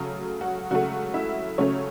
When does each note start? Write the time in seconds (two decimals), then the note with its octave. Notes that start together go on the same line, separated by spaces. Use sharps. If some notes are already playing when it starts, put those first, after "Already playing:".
Already playing: C#3 F#3 A3
0.41 F#4
0.71 C#3 F#3 A3 F#4
1.14 E4 E5
1.58 C#3 F#3 A3 C#4 C#5